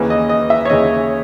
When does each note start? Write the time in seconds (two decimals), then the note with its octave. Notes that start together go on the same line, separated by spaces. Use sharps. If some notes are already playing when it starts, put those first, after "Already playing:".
Already playing: D#2 C#3 E3
0.10 D#5
0.29 D#5
0.50 E5
0.65 C#5
0.69 D#2 C#3 E3 D#5